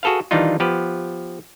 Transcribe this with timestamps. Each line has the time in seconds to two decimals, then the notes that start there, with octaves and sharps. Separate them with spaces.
0.03 F#4 G#4 A4 B4 F5
0.31 D#3 E3 G3 D4 D#4 F4
0.60 F3 B3 G4 B4